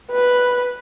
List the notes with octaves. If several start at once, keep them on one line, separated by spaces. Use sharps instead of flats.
B4